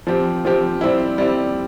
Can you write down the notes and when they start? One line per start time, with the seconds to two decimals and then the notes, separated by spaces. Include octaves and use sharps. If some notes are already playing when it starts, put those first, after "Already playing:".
0.07 F3 C4 G4
0.45 F3 C4 G4
0.81 G3 C4 E4
1.18 G3 C4 E4